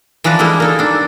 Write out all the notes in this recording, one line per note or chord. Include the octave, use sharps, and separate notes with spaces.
E3 F3 D4 B4 A#5
E3 G3 G#3 A#3 E4
A#3 D#4 A4
C4 D4